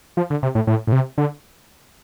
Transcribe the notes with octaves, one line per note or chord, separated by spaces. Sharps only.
F3
D3
C3
A2
A2
A2
C3
D3